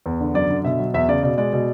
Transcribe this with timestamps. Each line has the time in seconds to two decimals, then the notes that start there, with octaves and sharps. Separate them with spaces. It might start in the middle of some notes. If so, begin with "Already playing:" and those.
0.06 E2
0.20 D3
0.34 F#2 D5
0.50 D3
0.64 B2 E5
0.79 F#3
0.94 E2 E5
1.08 C#3 D5
1.23 B2 D5
1.38 G#3 D5
1.53 B2